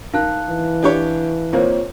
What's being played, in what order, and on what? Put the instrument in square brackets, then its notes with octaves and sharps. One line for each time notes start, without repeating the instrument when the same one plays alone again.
[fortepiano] D#3 [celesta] F5 A5 F#6
[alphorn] E3
[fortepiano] D4 G4 C#5
[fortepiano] D#2 A#3 C4 [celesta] F4 C5 C#5